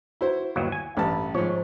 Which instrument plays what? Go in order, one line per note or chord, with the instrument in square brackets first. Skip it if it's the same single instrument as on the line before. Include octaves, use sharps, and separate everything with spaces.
[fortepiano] E4 F#4 C5
[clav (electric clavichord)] G1 D#2 F#3
G#5
[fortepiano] A1 A5 [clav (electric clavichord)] G2
[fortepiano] G#2 F3 [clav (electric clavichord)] C#5